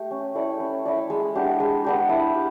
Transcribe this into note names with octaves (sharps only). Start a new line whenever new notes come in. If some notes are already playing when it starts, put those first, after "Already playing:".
Already playing: A3 G4
C#4
E4 A4 D5
C#4
E4 A4 D5
G#3
B3 D4 G4
G#3
B3 D4 G4
E4
G4